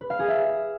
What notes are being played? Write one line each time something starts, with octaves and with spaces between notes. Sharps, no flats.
B4
F5
G#4
E5